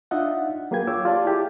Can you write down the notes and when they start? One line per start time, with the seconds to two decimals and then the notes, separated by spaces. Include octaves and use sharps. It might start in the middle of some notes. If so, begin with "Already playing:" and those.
0.11 D4 D#4 F4 D#5 E5 F#5
0.71 F#3 A#3 G#4 B4 G5 G#6
0.87 F4 C#5 G5 D6 E6
1.05 F4 G4 D5 A5
1.25 E4 G4 G#4